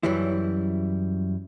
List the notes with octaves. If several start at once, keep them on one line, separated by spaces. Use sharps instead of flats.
F#2 E3 F#3 G3 E4